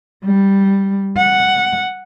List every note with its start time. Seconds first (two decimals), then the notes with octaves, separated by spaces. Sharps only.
0.25 G3
1.17 F#5